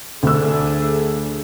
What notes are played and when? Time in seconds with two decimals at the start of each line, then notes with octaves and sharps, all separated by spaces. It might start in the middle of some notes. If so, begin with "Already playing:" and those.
0.23 D2 A3 D4 G#4 E6